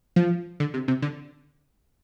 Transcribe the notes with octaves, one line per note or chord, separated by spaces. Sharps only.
F3
D3
C3
C3
D3